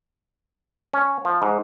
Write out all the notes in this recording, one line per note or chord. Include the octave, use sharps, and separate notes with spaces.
C#4
F3
G#2